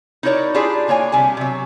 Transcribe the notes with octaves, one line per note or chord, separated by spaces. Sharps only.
D#4 E4 F#4 A#4 C#5 D5
D4 E4 F4 G4 G#4 D5
D3 A#3 C#5 G#5
C3 G3 D4 G#5
C3 F#3